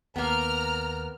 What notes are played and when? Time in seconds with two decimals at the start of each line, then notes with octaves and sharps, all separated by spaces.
0.16 D#2 A#3 B3 A#5 F6